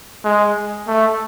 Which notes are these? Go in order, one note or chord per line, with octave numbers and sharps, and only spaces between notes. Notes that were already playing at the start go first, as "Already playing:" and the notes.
G#3
A3